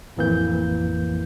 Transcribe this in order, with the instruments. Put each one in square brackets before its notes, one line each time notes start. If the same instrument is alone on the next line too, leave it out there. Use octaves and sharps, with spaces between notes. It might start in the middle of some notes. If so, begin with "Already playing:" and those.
[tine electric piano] A1 F2 E3 A#3 G6